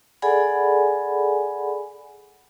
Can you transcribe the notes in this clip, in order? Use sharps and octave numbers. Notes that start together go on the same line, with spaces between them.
G#4 A4 D5 F#5 G#5 B5